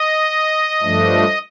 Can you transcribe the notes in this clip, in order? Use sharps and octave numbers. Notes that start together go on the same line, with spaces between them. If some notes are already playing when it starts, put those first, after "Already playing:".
Already playing: D#5
G2 F3 A3 D4